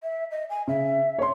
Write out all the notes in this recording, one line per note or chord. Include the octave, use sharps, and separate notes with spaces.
E5
D#5
G#5
C#3 E5
C#5 C6